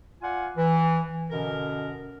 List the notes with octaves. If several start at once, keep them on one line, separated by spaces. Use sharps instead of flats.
F4 D5 F#5 G#5
E3
F#2 B2 D3 A#4